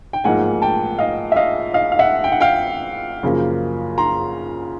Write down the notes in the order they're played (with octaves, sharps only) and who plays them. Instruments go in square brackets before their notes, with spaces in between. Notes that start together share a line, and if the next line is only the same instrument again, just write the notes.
[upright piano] G5
A1 G#2 F3 A#3 D#4 F#5 G#5
G5 A5
D#5 F5
E5
D#5 F5
D#5 F5
F5
E5 F#5
G5
F#5
F5 G5
F#2 C#3 F3 A#3
A#5 C6